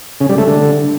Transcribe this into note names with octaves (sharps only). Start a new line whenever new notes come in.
C#3
G3
A3
D3